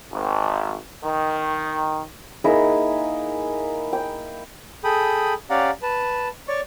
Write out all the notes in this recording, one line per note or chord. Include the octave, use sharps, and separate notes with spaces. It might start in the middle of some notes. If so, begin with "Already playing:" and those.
G#1
D#3
A#3 D#4 E4 G#4
G5
G#4 A4 G5 B5 D#6
C#4 G4 D5 F5 F#5 A#5
B4 A5
C#5 D5 C#6